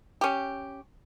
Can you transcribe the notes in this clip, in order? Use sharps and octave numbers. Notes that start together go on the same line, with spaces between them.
C#4 G4